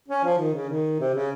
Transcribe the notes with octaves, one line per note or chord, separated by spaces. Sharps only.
C#4
F3
D#3
C#3
D#3
C3
C#3